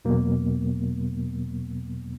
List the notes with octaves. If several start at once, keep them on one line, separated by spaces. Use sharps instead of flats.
E2 B2 F#3 A#3 B3